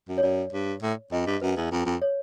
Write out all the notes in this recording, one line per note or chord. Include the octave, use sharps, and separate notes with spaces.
F#2
C#5
F#2 D5
G2
A2
F2 D#5
G2
F#2 B4
E2
F2
F2
C#5